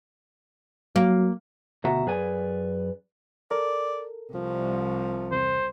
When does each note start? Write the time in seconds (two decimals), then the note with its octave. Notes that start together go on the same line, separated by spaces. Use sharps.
0.96 F#3 A#3
1.84 D2 B2 F#4 E5 A#5
2.06 F#2 G#4 B4 D5 G#5
3.51 A4 A#4 D5
4.34 C2 F3
5.31 E2 C3 C5